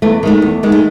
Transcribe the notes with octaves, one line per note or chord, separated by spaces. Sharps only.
E2 A3
D#3 G#3 A3
E2
D#3 G#3
A3